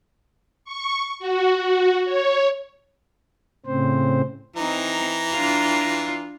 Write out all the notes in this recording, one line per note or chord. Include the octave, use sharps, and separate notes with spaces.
C#6
F#4
F#4
C#5
A2 C#3 C4 C5
E3 C4 D#4 A#5
D4 F4